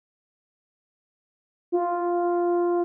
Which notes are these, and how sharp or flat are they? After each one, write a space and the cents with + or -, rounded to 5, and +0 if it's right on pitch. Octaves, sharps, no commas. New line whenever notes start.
F4 +0